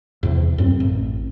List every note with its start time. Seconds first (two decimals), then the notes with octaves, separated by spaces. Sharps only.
0.23 E2 C3
0.58 F#2 C4
0.80 A1